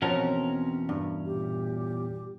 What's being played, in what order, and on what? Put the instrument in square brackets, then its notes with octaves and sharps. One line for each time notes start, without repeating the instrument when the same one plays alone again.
[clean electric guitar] E2 C#4 A#4 [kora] B2 F3 C#5 [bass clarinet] C4
[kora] G2
[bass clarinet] A#2 [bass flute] G4